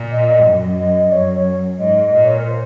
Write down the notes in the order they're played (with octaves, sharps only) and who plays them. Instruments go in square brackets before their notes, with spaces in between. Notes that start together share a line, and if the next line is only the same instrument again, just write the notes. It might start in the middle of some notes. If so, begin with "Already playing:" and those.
Already playing: [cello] A#2
[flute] D#5
D#5
[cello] F#2
[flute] D#5
[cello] F#2 [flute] C#5
[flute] C#5
[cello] G#2 [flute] D#5
[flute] D#5
[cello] A#2
[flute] C#5
A#4
C5